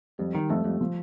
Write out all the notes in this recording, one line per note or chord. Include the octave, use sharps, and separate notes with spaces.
F2 G3
D#3 G3
F2 A3
F2 G3
F3